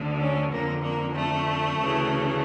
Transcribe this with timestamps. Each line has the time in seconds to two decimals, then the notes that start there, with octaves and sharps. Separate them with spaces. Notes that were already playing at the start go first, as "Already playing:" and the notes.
Already playing: D2 D3
0.21 C#4
0.52 F2 D3 A#3
0.83 A#3
1.15 A3
1.78 D2 C#3 E3